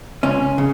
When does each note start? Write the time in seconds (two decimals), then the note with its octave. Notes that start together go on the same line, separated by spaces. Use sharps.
0.23 C#2 C#4
0.58 C#3